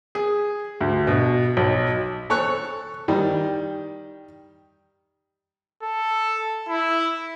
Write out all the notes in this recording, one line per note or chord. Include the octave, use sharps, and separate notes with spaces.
G#4
D2
B2
B1
A4 C#5 C#6 F#6
D#3 G3
A4
E4